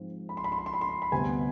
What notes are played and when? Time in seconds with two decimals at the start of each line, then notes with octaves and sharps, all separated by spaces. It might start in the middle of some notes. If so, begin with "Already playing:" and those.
Already playing: G#2 F3 C4
0.29 B5
0.37 C6
0.44 B5
0.52 C6
0.58 B5
0.66 C6
0.74 B5
0.81 C6
0.89 B5
1.02 B5
1.12 D2 C3 G3 B3 G#5